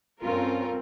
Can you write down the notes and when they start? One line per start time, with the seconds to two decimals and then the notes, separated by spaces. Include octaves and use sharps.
0.21 G2 C4 C#4 F4 A4 A#4